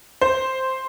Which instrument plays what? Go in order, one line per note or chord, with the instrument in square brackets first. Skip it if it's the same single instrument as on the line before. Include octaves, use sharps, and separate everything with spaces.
[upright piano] C5